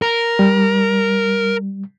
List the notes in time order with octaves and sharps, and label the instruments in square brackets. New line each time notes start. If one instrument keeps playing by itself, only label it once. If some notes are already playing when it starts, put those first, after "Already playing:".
[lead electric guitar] A#4
[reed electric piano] G3